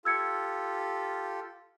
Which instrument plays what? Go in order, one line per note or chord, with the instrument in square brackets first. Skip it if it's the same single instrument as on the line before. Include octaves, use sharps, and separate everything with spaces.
[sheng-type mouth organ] F4 G4 A4 [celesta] E6 G#6 C#7